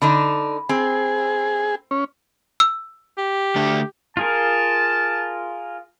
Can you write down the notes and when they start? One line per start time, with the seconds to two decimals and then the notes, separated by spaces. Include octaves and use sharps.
0.02 D3 D4 D#4 B5
0.69 C4 G#4
1.91 C#4
2.60 E6
3.18 G4
3.56 D3 A3 D4
4.17 F4 G#4 A#4 A5